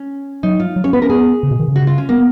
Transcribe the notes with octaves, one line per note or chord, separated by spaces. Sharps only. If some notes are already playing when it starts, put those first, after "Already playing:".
Already playing: C#4
F#3 D#4
F4
F#3
C#4 C#5
B3 B4
C#4 A#4
B3 G#4
C#3
B2
D#3
C#3
F#4
F4
C#4
A#3 B3